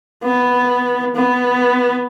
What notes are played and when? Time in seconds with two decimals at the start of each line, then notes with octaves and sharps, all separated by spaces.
0.23 B3
1.16 B3